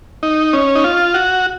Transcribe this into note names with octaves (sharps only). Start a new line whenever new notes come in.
D#4
C#4
D#4
F4
F#4